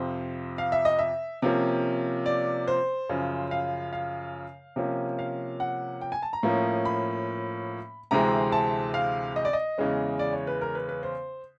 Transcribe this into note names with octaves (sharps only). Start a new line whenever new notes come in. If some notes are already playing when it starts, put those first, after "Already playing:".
Already playing: F2 C3 F3 C5
F5
E5
D#5
E5
C3 F3 A#3 C#4
D5
C5
F#2 C#3 F3
F5
F5
C3 F3 A#3 C#4
F5
F#5
G5
G#5
A5
A#5
A2 F3 A#3 C#4
B5
D2 C3 E3 G#3 C4 A#5
A5
F5
D#5
D5
D#5
E2 C#3 E3 G#3 C#4
D5
C#5
B4
A#4
B4
B4
C5